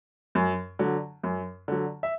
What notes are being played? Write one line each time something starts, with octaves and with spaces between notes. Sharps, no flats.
F#2
D3 F#3
F#2
D3 F#3
E5